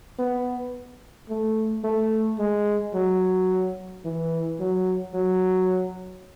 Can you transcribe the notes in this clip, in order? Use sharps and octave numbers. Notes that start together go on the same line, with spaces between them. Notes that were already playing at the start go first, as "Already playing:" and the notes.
B3
A3
A3
G#3
F#3
E3
F#3
F#3